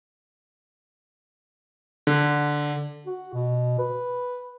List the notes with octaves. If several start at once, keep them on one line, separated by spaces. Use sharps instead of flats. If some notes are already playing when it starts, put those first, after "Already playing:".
D3
F#4
B2
B4